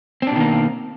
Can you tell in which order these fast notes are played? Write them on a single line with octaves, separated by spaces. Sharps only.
C4 D4 B2 D#3 A#3